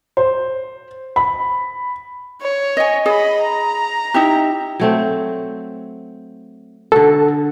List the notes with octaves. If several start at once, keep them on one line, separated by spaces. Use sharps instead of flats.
C5
B5
C#5
D#5 G#5
G#4 D#5 B5
A#5
D#4 E4 G4
F#3 A3 C4
D3 F#4 A4